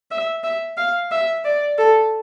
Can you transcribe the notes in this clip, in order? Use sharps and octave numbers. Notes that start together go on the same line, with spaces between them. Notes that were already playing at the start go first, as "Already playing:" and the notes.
E5
E5
F5
E5
D5
A4